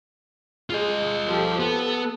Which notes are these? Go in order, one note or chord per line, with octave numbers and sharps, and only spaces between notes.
G#3 F4 D#5
F3 G4 A4
B3 A4